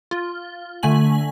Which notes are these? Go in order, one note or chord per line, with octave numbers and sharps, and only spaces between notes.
F4
D3 A3 G#5 F#7